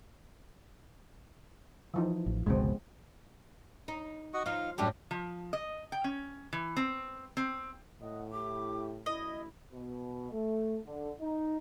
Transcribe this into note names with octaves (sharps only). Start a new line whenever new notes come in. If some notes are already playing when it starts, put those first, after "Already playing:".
E3 F3 D#4
A1
G1 C#2 B2 G#3 B3 C4
D#4
F#4 D#5 C#6
F3 D#4 F5
F#2 A2 G3 D4 G4
F3
D#5
G5
C#4
E3
C4
C4
A2 D#5 F#5
E4 G4 D6
A1 D2 E4 D#5
B2
A3
D3
D#4